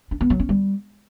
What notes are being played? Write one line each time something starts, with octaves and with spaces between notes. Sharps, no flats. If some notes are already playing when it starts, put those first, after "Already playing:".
D4
B3
F#3
C#4
G3